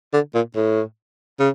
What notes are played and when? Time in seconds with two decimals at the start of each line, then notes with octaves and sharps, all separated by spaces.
0.13 D3
0.35 A#2
0.56 A2
1.40 C#3